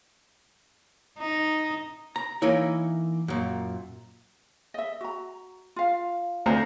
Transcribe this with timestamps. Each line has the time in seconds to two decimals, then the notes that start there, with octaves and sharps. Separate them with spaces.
1.19 D#4
2.16 A#5
2.42 E3 A#3 D#4 E4 C#5
3.28 F#2 A#2
4.74 D#5 E5
5.01 F#4 A#5
5.76 F4 F5
6.46 D2 C4 A#5